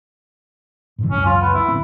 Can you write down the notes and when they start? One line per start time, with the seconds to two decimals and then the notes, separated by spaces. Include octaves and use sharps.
0.98 G#2 C3 E3
1.11 C#2 F#2 C#4
1.26 F4
1.42 B3
1.54 E4
1.68 D1 C4